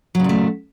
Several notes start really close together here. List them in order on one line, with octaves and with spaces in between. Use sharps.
F#3 C#3 A#2 A3